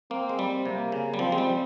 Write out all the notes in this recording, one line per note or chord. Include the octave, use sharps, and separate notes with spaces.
A#3 C4
G#3
G3
C3 A#3
C#3
G3
F3 C4
G#3
G3